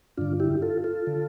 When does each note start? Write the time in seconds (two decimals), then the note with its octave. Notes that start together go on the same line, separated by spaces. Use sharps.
0.17 G2 D3 D4 F4
0.40 E4 G4
0.62 F4 A4
0.84 F4 A4
1.07 D3